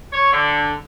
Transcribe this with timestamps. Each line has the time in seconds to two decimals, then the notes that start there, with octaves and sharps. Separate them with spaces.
0.13 C#5
0.33 D3